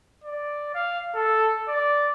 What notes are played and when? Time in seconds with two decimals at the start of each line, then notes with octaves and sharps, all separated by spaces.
0.24 D5
0.75 F5
1.15 A4
1.68 D5